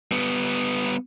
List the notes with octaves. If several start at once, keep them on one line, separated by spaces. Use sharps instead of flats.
G3 B3